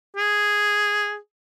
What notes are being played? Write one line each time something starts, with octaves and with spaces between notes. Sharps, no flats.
G#4